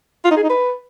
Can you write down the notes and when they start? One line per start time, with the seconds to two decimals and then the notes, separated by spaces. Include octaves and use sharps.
0.25 F4
0.31 D#4
0.37 G#4
0.43 D#4
0.49 B4